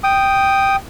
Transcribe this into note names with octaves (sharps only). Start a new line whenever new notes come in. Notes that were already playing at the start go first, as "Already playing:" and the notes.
G5 D#6